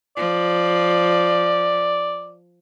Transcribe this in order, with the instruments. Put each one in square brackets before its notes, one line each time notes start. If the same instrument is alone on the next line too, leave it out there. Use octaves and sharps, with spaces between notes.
[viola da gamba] F3 [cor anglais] D5